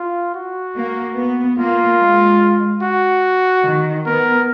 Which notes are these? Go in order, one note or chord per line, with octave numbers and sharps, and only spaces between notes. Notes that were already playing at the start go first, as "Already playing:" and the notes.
Already playing: F4
F#4
A#3
B3
A#3 F4
G#3
F#4
D#3
B3 A#4